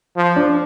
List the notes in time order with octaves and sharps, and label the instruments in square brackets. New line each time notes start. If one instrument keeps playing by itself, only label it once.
[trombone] F3
[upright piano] D4